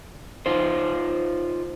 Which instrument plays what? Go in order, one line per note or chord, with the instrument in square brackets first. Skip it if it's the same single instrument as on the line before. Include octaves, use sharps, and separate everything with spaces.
[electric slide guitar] D#4 F4 C5